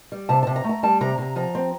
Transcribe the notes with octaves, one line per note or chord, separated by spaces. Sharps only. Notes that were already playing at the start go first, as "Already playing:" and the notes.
G3
C3 A5
C3 A5
A#5
A3
A#5
G3 A5
C3 A#5
C3 A#5
F3 A#5
C4